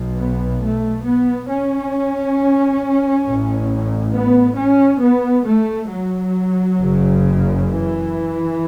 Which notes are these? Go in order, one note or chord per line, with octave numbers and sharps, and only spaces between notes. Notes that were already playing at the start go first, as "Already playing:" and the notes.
Already playing: B1 B2
B3
A3
B3
C#4
A1 A2
B3
C#4
B3
A3
F#3
F#1 F#2 C#3
E3